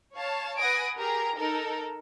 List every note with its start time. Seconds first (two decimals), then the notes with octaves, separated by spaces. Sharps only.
0.15 C#5 F5 A5
0.58 B4 F#5 G#5 D#6 A#6 D7
0.97 G4 G#4 A#4 A#5
1.37 D#4 A4 A#4